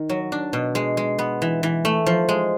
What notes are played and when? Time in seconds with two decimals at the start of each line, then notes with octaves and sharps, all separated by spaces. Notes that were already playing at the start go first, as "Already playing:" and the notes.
Already playing: D#3
0.09 F#3
0.32 D4
0.53 B2
0.75 G#3
0.97 G#3
1.19 B3
1.42 E3
1.63 E3
1.85 A3
2.06 F3
2.29 G#3